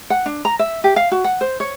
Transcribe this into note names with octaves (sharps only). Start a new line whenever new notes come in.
F#5
D4
A#5
E5
G4
F5
F#4
F#5
C5
C#5